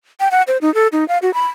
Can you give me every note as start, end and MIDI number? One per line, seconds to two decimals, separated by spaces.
0.20 0.29 79
0.31 0.42 78
0.48 0.57 72
0.61 0.73 63
0.74 0.87 69
0.92 1.07 63
1.08 1.18 77
1.22 1.33 66
1.34 1.46 83